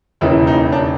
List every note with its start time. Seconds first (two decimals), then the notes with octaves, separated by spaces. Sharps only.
0.21 E1 D#2 C#3 E3 E4
0.47 D#4
0.72 D4